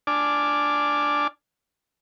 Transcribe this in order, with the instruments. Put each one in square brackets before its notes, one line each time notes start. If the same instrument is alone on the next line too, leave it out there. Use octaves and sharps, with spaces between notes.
[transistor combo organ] D4 D5 G#5 A5 D6 F6